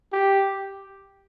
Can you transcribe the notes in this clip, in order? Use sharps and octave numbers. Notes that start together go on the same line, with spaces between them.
G4